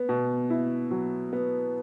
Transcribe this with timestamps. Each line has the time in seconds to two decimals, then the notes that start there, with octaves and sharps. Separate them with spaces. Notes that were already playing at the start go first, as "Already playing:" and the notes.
Already playing: B3
0.09 B2
0.50 E4
0.91 F#3
1.33 B3